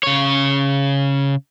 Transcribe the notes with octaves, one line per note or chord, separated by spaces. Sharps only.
C#3 C#5